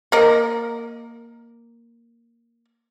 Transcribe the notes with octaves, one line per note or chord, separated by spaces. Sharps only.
A#3 A#4 D#5